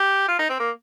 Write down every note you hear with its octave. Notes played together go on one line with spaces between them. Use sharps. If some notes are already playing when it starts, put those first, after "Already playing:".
Already playing: G4
F4
D#4
C4
A#3